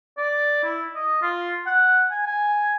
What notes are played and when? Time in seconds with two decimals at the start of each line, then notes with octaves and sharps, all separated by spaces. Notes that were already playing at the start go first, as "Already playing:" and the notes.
0.17 D5
0.64 E4
0.95 D#5
1.22 F4
1.66 F#5
2.11 G#5
2.27 G#5